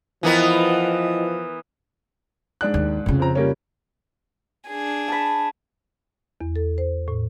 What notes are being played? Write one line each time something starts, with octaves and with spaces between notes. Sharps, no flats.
E3 F3 B3 E4 A#4 D#5 G5
G#2 D4 F#6
D#2
F2 C#3
F3 C4 A#5
G3 A#3 C#4
D4 G#4
A5 B5
E2
A4
C5
A2